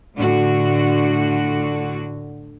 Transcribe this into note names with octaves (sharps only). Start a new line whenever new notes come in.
A2 D3 F#4